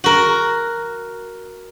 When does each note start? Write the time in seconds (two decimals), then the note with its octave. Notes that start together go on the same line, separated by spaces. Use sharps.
0.04 F#4 A#4